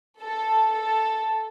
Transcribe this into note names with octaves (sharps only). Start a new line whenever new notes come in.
A4
A4